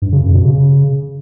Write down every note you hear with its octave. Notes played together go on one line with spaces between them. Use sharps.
G2
C#3
F#2
B2
C#3